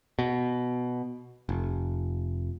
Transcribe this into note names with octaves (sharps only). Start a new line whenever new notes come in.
B2
F1